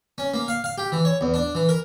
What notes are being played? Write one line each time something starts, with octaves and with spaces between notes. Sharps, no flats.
C#4
A#3
F5
F5
G4
E3
C#5
E2
D4
E3
A#4